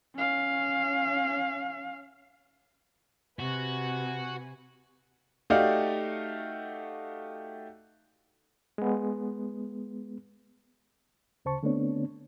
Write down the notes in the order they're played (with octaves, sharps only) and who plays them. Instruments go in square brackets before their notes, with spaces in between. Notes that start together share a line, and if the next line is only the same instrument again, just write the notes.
[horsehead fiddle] C#4 F5
[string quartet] C3 B4 G#5 [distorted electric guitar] F#4
[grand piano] A3 D#4 F#4 G4 D5 F5
[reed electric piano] G#3 B3
D2 C#3 C5 A5 C#6
D3 A3 B3 C4 D4 C#5